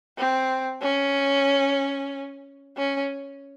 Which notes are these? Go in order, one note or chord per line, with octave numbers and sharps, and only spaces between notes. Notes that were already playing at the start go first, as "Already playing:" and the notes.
C4
C#4
C#4